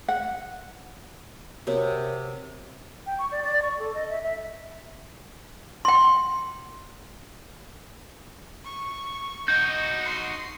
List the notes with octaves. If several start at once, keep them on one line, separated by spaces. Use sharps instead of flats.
F#5
C3 B3 F#4 A#4 C#5
G5
C#6
D5
D5
C#6
A4
D#5
E5
E5
G5 C6
C#6
D#4 F#4 D#5 G6
C6